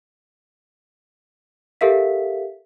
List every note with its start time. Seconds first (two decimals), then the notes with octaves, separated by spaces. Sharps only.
1.81 G4 A4 A#4 E5 F5 B6